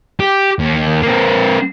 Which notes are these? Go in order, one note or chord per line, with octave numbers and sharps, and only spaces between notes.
G4
D#2
A#3 C4